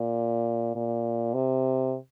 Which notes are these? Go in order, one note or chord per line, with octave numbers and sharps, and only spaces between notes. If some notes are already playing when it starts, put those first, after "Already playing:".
Already playing: A#2
A#2
C3